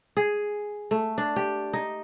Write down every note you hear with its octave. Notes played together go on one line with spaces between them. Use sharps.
G#4
A3
D4
G4
D#4